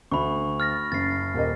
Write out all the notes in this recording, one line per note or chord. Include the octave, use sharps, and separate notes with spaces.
D2 B5 C#6
F6 A6 A#6
F#1 A6 C7
D#1 A#3 D#5